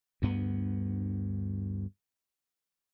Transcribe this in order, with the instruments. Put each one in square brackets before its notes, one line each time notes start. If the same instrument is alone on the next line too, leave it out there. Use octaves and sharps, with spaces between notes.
[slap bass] D2 G2 B3